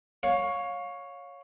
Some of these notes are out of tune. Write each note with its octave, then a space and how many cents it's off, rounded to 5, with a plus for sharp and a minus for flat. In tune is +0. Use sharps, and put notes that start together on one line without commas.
C#5 +0 F5 +25